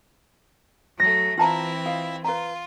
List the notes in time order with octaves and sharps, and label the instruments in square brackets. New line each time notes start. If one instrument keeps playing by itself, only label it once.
[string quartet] F#3 A3 [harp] A#6
[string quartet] E3 C4 E4 [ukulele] F4 A5 A#5
[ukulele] F4 D#5 F5
[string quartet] F4 [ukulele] B4 A#5